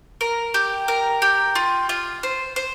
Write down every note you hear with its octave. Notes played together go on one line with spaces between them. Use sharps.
A#4
G4
A#4
G4
F4
F4
C5
C5